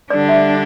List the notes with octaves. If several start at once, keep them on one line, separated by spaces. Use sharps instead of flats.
D3 G3 D4 D5
E5